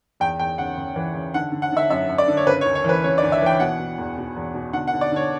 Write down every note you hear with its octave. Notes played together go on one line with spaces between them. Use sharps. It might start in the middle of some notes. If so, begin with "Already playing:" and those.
E2 G5
E2 G5
C#3 F#5
C#3
E3
C#3
D3 F#5
D3
F#5
D3 E5
F#2 E5
F#2
D5
D3
C#5
C#3 B4
C#5
D2
C#5
E3 B4
C#3 C#5
D5
D2
E5
E3 G5
B2 F#5
B2
E2
B2
E2
B2
D3 F#5
F#5
D3
D5
D3 C#5